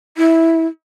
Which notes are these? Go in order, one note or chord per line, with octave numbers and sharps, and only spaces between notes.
E4